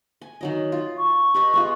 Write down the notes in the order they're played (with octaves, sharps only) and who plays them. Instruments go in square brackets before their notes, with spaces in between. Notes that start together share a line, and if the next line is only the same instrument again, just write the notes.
[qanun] G#5
D#3 F#3 D#5
F4
[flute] C#6
[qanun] G4 B4 D#5
G#3 B3 F4